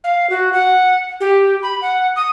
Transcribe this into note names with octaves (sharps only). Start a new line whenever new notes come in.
F5
F#4
F#5
G4
B5
F#5
D#6